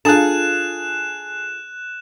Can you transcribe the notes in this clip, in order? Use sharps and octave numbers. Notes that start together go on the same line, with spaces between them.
D4 F4 G#4 A4 A5 F#6 E7